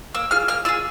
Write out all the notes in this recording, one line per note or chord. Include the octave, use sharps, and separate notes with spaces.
A#3 E6
F4 G#4 F6
A#3 F6
F4 G#4 E6